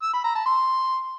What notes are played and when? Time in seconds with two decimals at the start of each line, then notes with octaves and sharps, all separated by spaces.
0.02 E6
0.13 B5
0.24 A#5
0.35 A5
0.45 C6